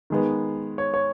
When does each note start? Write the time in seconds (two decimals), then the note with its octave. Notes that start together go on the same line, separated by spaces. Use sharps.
0.10 D#3 G#3 B3
0.78 C#5
0.94 C#5